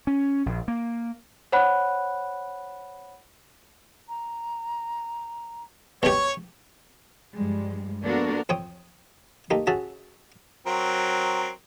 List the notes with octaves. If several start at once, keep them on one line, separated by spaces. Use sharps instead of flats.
C#4
A#1
A#3
C5 C#5 F#5 B5 F#6
A#5
B2 G4 C#5
G2 F3 G3 G#3
A#3 B3 D4 F#4 A4 A#4
F2 C4 C#5 G5 D#6
A3 A#3 D#4 G4
C#4 F#4 G#4 E5 A5
F#3 C4 A#4